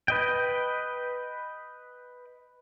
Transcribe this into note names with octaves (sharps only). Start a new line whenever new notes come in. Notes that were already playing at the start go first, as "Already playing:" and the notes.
B4 D#5 G5